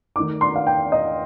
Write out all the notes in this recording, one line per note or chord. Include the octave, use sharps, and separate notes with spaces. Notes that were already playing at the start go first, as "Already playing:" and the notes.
D#3 A3 D#4 D6
C6
F5
G5
D#5